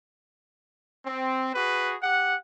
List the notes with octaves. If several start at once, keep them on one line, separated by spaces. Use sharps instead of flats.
C4
F#4 G#4 B4
G4 F#5